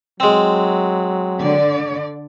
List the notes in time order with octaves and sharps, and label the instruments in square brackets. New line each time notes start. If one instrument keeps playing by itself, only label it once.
[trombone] F#3 [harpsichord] G#3 C4
[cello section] D3 D5